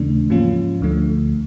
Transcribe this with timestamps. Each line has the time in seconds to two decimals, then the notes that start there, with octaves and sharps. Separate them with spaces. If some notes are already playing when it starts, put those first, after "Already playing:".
Already playing: D#2 C#3 E3 A3 D4
0.30 G#2 F3 A#3 C#4 F4
0.81 D2 D3 F3 A3